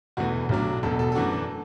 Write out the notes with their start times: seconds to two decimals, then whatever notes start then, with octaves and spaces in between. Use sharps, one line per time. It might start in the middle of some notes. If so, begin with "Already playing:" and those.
0.17 E1 E2 E3 A3 F#4
0.49 B1 A2 F#3 D4
0.83 E1 E2 B2 A4
0.99 A4
1.12 A4
1.15 F#2 E3 A3 D4 F#4
1.33 A4